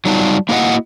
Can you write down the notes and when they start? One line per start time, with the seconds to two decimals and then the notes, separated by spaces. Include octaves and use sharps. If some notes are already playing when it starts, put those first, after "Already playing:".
0.05 F#3 G3 D#4 F4 F#4 A5
0.49 A#3 E4 F#4 C5 D#5 F#5